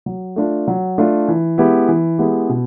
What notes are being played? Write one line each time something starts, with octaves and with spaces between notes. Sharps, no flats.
F#3
A3 D4 F4
F#3
A3 D4 F4
E3
G#3 B3 E4 G4
E3
G#3 B3 E4 G4
B2